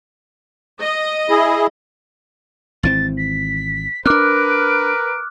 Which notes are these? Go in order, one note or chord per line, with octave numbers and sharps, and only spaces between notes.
D#5
E4 G#4
G#1 E3 C4 A6
B6
C4 D4 A#4 B4 D6 F6 F#6 D7